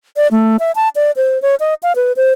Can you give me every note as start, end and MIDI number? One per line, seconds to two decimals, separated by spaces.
0.17 0.27 74
0.31 0.57 57
0.59 0.72 76
0.76 0.89 81
0.96 1.11 74
1.16 1.41 72
1.42 1.55 73
1.60 1.74 75
1.83 1.93 77
1.96 2.12 71
2.16 2.33 72